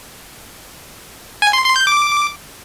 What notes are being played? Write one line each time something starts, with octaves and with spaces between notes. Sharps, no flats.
G#5
C6
C6
G6
D6